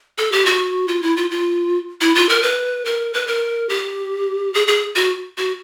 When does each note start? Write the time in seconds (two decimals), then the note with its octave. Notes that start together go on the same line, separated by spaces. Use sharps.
0.18 A4
0.32 G4
0.46 F#4
0.88 F4
1.02 E4
1.17 F4
1.31 F4
2.01 E4
2.15 F4
2.29 A#4
2.42 B4
2.85 A#4
3.14 B4
3.27 A#4
3.69 G4
4.54 G#4
4.68 G#4
4.96 F#4
5.37 F#4